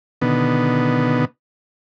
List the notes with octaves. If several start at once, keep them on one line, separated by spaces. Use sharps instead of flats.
B2 D3 D#3 B3